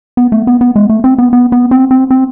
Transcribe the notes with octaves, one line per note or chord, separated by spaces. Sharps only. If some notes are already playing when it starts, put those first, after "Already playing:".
B3
A3
B3
B3
G#3
A3
C4
B3
B3
B3
C4
C4
C4